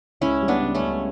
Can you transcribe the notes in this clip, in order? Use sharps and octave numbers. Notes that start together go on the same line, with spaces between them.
C#2 C#4 E4
G3
B3 D4
C#3
A3 C#4
C#2